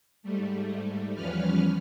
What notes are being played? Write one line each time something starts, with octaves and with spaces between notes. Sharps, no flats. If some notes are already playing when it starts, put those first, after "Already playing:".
G#2 G3 A3
E2 F3 G3 C#4 B4 F6